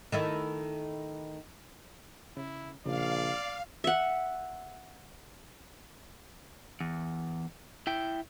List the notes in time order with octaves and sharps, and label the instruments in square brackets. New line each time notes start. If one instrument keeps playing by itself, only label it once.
[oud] D#3 A3 E4
[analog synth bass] C#3 [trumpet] E4
[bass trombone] A#1 [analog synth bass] C#3 [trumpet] D5 [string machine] F5
[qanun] E5 F#5
[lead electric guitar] E2
E4 G5